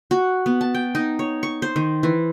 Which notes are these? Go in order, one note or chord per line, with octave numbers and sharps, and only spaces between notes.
F#4
B3
A5
G5
D#4
C#5
C#6
C5
D#3
E3